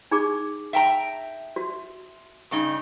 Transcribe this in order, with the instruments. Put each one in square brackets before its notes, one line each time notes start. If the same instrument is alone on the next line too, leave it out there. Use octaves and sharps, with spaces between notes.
[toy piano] D#4 G#4 D6
[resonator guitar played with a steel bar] E5 G5 A#5
[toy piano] F#4
[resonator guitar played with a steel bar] G2 C#3 D#4